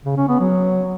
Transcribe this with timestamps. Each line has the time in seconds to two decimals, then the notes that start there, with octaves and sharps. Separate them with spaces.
0.05 C#3
0.17 C#4
0.28 B3
0.40 F#3